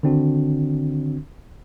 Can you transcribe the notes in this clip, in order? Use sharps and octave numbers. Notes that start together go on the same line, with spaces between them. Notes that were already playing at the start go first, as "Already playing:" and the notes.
D3 D#3 C4 D4 F#4